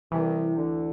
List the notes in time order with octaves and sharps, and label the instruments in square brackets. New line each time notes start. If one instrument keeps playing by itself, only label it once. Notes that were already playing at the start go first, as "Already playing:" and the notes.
[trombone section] C2 C3 [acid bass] E3
[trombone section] D2 D3